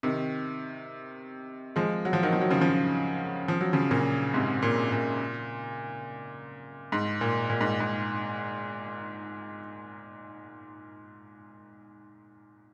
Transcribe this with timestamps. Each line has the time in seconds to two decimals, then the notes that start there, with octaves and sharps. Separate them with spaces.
0.03 C3 D#3
1.76 F3 G#3
2.05 F#3
2.13 F3
2.23 D#3 F#3
2.33 F3
2.41 F#3
2.50 C#3 F3
2.61 C#3 F3
3.48 F3
3.61 F#3
3.73 C#3 F3
3.91 A#2 C#3
4.34 G#2 C3
4.62 A#2
4.92 A#2
6.92 G#2
7.21 A#2
7.50 A#2
7.61 G#2
7.80 G#2